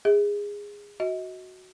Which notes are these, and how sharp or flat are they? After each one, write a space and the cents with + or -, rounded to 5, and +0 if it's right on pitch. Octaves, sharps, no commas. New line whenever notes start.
G#4 -20 E5 -45
F#4 +0 D#5 +35